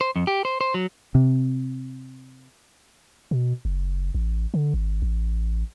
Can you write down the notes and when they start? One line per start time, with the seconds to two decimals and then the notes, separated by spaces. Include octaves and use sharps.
0.01 C5
0.16 F2
0.27 G4
0.45 C5
0.61 C5
0.74 F#3
1.15 C3
3.31 B2
3.65 F#1
4.15 A1
4.54 D3
4.74 G#1
5.02 A1